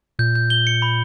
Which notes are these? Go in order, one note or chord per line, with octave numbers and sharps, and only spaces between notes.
A#2 G6
G6
G7
C#7
B5